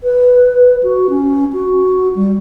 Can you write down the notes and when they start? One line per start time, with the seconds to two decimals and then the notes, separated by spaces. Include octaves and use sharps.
0.03 B4
0.83 F#4
1.10 C#4
1.53 F#4
2.15 G3